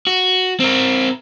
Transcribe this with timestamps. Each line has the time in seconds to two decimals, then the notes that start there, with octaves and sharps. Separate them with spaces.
0.07 F#4
0.60 C4 A#4